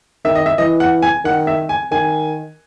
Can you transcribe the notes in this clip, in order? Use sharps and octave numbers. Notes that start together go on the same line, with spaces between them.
D#3 E5
D#5
E5
E3 D#5
F#5
G#5
D#3 F#5
E5
G#5
D#3 G#5